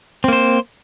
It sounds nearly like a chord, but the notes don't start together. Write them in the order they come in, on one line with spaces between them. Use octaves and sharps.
C4 A#3 C5